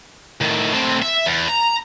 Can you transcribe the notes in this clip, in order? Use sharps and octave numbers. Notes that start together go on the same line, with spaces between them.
A2 D#3
A2 C4
E5
E2
A#5